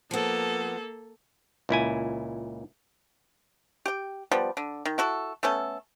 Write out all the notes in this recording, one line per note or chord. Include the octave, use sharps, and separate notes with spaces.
F3 A#3 B3 A4
C#2 A#2 E4 G#5
G4 G5
F3 G3 B3
D3
D#3
E4 F#4 A4
A3 B3 C#4 A4